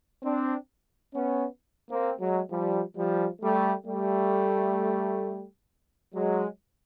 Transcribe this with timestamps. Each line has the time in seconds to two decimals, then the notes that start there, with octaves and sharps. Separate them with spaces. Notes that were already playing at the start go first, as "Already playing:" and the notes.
0.23 C4 D4
1.14 B3 C#4
1.90 A#3 C4
2.20 F#3 G#3
2.50 F3 G3
2.96 F3 G3
3.41 G3 A3
3.86 G3 A3
6.14 F#3 G#3